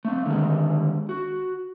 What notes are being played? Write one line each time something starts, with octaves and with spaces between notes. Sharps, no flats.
A3 C4
D3 D#3 G3 G#3
F#4